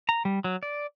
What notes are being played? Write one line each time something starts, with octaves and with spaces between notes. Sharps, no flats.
A#5
G3
F#3
D5